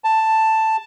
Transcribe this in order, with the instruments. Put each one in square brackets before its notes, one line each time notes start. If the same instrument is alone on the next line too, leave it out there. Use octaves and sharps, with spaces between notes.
[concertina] A5